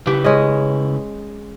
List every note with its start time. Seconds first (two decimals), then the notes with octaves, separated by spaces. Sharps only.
0.07 C#3 E4 G4 B4
0.24 G#3 C#4 D#5